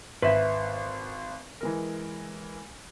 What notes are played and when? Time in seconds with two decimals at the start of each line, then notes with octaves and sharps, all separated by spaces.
0.22 G#1 B4 E5
1.61 E3 G#3 A#4